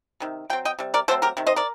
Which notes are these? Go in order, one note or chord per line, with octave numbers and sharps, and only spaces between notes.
C3 D#3
F#3 C4 G5
D#5 G5
C3 G3
A#4 D5
F#3 A3 C4 A4 C5
G4 A#4
C3 D#3
C5 D#5
A#4 D5